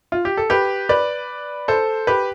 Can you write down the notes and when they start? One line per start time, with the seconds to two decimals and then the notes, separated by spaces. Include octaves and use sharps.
0.12 F4
0.25 G4
0.37 A4
0.50 G4 B4
0.89 B4 D5
1.68 A4 C5
2.07 G4 B4